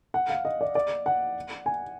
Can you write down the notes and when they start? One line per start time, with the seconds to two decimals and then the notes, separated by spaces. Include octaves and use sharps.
0.14 F#5
0.29 F5
0.45 D#5
0.61 D5
0.75 D5
1.06 F#5
1.66 G#5